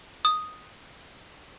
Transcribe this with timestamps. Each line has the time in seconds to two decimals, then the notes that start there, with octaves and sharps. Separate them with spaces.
0.25 D#6